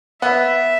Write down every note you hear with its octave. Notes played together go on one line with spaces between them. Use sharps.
B3 E5